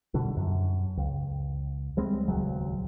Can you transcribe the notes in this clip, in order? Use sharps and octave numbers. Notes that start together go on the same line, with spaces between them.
B2 D3 G3
F#2
C#2
G3 G#3 C4
D#1 C#2 F#3